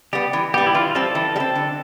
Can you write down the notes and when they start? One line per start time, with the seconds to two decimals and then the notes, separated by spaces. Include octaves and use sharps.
0.13 G3 B3 G4
0.33 E3
0.54 G3 B3 G4
0.66 E4
0.75 E3 F4
0.95 G3 C4 A4
1.15 E3
1.36 G3
1.40 C4
1.56 D3